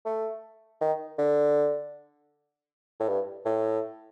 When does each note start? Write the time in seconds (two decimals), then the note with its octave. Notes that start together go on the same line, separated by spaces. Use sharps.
0.05 A3
0.81 D#3
1.19 D3
3.00 A2
3.08 G2
3.45 A2